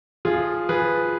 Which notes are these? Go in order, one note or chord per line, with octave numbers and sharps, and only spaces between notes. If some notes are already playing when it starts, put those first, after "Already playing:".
F3 F4 G#4
F3 G#4 B4